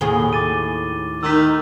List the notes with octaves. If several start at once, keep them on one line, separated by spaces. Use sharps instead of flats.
D#2 A2 G#4 G7
D6 A6 D#7
D#3 E6 B6